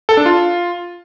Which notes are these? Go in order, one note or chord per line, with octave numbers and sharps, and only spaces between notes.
A4
D4
F4